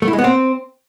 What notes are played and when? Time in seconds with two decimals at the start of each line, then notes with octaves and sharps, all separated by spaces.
0.02 A3
0.08 E4
0.13 G#3
0.19 B3
0.24 C4